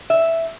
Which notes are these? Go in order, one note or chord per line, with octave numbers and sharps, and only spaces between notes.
E5